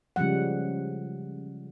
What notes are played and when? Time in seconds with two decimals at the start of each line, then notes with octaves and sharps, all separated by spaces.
0.16 C#3 F3 G3 G#3 F#5